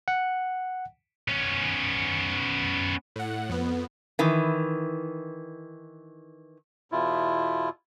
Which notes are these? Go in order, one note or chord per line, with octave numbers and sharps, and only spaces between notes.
F#5
B3 C#4
A2 F#5
F2 B3
D#3 E3
E2 B2 E4 F4